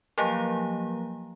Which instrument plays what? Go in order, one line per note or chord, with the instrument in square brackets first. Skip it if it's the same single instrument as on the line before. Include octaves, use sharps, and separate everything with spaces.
[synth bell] F3 F#3 A#3 G4 F5 A#5